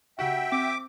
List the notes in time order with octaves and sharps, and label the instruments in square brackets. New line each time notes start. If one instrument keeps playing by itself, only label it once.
[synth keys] C#3 G4 F#5 [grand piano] F#4 [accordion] E5 G5
[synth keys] C4 [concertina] D6